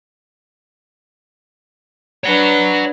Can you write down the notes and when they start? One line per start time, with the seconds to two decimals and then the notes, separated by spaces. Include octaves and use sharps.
2.24 D4 B4 C#5 F#5